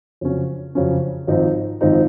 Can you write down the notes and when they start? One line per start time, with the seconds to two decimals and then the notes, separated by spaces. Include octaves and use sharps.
0.21 F2 C#3 F#3 C#4
0.75 F2 C#3 F#3 C#4
1.27 G#1 G#2 F3 C4 D#4
1.81 G#1 G#2 F3 C4 D#4